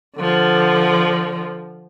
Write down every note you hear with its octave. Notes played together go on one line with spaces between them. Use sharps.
D3 F3